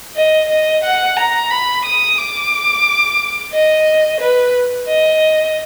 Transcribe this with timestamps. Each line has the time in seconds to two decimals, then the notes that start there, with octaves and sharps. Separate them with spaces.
0.16 D#5
0.49 D#5
0.83 F#5
1.17 A#5
1.51 B5
1.85 D#6
2.18 D6
3.53 D#5
4.21 B4
4.88 D#5